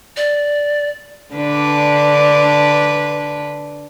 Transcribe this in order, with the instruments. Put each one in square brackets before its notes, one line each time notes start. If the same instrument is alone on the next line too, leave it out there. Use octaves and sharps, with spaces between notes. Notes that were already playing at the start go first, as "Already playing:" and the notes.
[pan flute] D5
[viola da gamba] D3 D4 B4